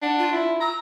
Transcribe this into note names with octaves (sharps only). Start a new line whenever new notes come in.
D4 F#5
F4
E4
A#5 E6